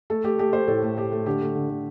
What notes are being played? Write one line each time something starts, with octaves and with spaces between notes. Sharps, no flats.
A3 A4
A3 G4
A3 G4
A3 C5
A2 A4
A3
A3 G4
A3
D3 G4
A3
D3
D3